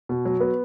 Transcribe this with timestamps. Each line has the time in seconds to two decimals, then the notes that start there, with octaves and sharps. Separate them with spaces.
0.09 B2
0.25 F#3
0.40 B3